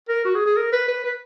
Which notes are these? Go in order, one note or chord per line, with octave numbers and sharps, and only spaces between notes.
A#4
F#4
G#4
G#4
A#4
B4
B4
B4